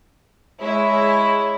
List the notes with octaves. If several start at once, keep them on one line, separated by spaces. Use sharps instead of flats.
G#3 E4 C#5